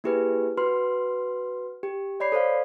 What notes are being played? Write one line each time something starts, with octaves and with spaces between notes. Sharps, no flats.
A#3 E4 G4 G#4 B4
F#4 B4 C6 F6
G4
C#5 D5 B5 C7
A4 C5 D5 F5